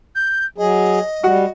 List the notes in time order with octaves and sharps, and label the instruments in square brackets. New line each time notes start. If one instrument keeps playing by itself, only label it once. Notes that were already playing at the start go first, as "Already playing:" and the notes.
[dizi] G6
[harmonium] F#3 G#4 [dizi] D#5
[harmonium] G3 [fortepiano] F#4 F#5